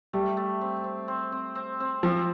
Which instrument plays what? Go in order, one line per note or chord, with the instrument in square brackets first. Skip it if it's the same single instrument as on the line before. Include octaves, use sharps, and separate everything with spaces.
[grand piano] G3 [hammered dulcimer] A3
[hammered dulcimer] A3
C4
C4
C4
C4
C4
C4
[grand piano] F3 [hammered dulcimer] C4